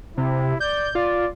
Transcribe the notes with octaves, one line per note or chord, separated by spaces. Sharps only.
C3 E4
D5 G6
F4 D5